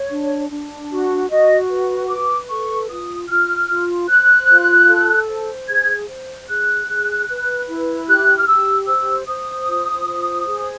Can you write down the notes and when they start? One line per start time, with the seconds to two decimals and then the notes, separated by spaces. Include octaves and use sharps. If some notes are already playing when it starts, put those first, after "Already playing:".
Already playing: C#5
0.10 D4
0.50 D4
0.90 F#4
1.30 F#4 D#5
1.70 B4
2.09 B4 D6
2.49 A4 C#6
2.90 F4 D#6
3.29 F4 F6
3.69 F4
4.09 C5 F#6
4.49 F4
4.88 A4
5.28 C5
5.69 G#4 G#6
6.08 C5
6.48 G#4 F#6
6.88 G#4
7.28 B4
7.68 E4
8.08 G4 F#6
8.38 F6
8.48 G4 E6
8.87 C5 E6
9.27 C5 D#6
9.67 F4
10.07 C5
10.47 G#4